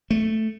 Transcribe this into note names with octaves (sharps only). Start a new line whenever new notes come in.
A3